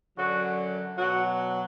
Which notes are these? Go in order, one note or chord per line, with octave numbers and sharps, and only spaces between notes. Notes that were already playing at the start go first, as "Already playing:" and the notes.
F#2 D3 F#3 F#4
B2 F#3 F#4